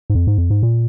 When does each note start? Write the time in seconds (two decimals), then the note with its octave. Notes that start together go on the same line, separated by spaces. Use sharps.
0.10 G#2
0.15 F2
0.27 G#2
0.38 F2
0.50 G#2
0.63 A#2